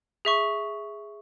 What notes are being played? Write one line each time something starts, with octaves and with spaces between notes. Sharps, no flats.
G#4 E5 C#6